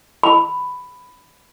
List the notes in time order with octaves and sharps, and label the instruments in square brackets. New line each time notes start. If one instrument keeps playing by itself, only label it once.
[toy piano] B5